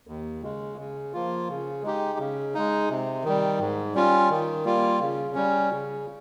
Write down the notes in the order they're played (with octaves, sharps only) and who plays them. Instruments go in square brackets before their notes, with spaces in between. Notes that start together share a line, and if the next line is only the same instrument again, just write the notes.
[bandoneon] D#2
C#3 G#3
C#3
F3 A#3 F4
C#3
G#3 D#4 G4
C#3
G#3 D#4
C3
D#3 G3
G#2
G3 C#4 F4
D#3
G3 A#3 F4
C#3
G3 C#4
C#3